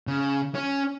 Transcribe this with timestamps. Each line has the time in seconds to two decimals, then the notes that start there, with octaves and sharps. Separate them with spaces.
0.07 C#3
0.55 C#4